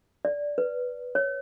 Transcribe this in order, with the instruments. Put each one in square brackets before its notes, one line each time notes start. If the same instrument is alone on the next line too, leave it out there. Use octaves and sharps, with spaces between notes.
[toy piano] D5
B4
C#5